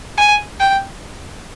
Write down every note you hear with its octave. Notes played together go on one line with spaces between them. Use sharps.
G#5
G5